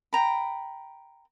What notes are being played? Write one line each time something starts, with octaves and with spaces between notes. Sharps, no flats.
G5 A#5 B5